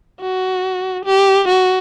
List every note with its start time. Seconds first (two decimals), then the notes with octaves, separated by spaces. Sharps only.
0.21 F#4
1.06 G4
1.48 F#4